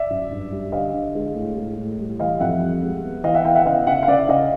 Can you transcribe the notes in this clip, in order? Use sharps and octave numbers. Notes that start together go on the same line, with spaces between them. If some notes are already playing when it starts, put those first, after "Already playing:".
Already playing: D5 E5
F#2
G2
G3
D3 D#5 F5
D3
G#3
A2
G#3
A2
G3
E3 D#5 F5
F2 E5 F#5
G3
G#3
B3
E3 D#5 F5
E5 F#5
B3 F5 G5
E5 F#5
C#3 D#5 F5
C#3 E5 F#5
F5
C#3 D5 E5
C#3 D#5 F5